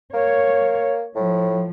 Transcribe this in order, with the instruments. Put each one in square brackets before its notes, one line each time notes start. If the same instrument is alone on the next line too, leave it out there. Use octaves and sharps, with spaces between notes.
[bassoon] A#3 [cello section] C#5
[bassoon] A2 [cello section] F3